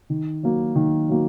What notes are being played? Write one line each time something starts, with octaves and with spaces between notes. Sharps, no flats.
D#3
F#3 A#3
D#3
F#3 A#3